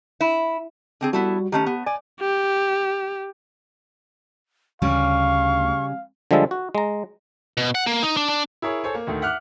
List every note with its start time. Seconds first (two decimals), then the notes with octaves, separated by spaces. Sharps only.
0.21 E4
1.01 D3 C4 G#4
1.13 G3 B3 E4 F#4 A4
1.52 D#3 A3 C#4 G4
1.66 B3
1.86 D5 G#5
2.21 G4
4.82 D2 C#3 G3 C#4 F5 C#6
6.31 D3 F3 G3 G#3 E5 A5
6.51 F#4
6.75 G#3 A#5
7.57 B2
7.75 F#5
7.87 A#3
8.03 D#4
8.17 D4
8.29 D4
8.62 E4 G#4 A#4 C#5
8.84 A4 C5 C#5 G#5
8.95 A#3
9.07 D2 D#3 A3
9.22 E5 F#5 D6 F6 F#6